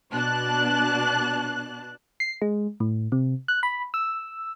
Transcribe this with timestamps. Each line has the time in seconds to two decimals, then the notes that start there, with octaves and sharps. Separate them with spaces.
0.13 B2 D4 A5 F#6
2.20 C7
2.42 G#3
2.80 A2
3.12 C3
3.48 F#6
3.63 B5
3.94 E6